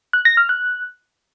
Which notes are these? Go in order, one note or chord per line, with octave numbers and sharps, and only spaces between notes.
F#6
A#6
F6
F#6